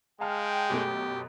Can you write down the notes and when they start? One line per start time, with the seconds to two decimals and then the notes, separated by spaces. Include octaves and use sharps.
0.21 G#3 F5 G5 A5 F6
0.70 F#2 B2 A3 G4